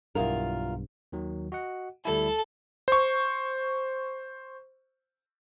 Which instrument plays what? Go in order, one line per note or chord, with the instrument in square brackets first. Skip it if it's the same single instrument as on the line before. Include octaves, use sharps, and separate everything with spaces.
[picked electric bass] B1 G2 [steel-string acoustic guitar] E2 F4 A#4
[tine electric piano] D#2 D#3 F#3
F#4 D#5 F#5
[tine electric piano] D2 G3 E4 [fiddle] A4 A5
[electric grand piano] C5 C#6